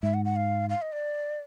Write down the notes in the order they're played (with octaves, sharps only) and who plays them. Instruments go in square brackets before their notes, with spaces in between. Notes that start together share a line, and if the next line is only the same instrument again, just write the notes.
[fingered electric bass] G#2 [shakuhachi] E5
[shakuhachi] F#5
F#5
F5
F5
D#5
D5